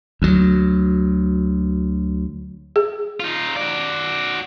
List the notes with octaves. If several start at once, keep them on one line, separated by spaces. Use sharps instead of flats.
D2 F#3
G#4
D#4 F4
F#4 D5